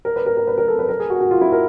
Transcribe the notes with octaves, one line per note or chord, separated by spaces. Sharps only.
A#4
B4
A#4
A#4
B4
A#4
A4
B4
A#4
G#4
F#4
F#4
F4
E4
A#4